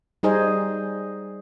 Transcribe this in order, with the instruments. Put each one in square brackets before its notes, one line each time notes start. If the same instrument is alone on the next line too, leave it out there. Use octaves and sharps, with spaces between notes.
[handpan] G3 D#4 G#4 C5 D#5